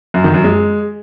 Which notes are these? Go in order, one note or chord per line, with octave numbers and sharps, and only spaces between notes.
F#2
D#3
F#2
G#3